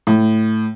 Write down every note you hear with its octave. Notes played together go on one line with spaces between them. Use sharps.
A2